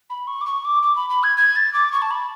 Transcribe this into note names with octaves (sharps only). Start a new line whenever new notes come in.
B5
C#6
D6
C#6
D6
D6
B5
B5
G#6
G#6
A6
D6
C#6
A5
B5